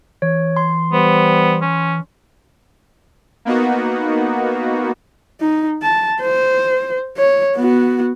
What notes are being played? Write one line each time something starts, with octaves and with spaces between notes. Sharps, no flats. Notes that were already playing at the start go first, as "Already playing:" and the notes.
E3 C#5
C6
G3 B3 C5
C#4
A#3 B3 D#4 F#4
D#4
A5
C5
C#5
B3 F#4